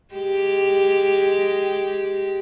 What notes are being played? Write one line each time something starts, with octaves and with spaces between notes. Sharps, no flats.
G#3 G4